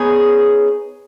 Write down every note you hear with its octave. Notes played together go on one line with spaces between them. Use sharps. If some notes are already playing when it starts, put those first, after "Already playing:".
Already playing: B3 D#4 G#4 C#5